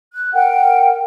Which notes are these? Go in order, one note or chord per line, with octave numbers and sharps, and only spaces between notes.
F#6
A#4 F#5 G5